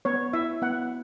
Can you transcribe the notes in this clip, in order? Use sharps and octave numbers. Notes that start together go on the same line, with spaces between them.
B3 C#5
E4 E5
B3 F#5